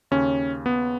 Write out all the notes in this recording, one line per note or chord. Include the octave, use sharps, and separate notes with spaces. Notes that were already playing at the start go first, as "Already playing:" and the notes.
D#2 C#3 C#4
B3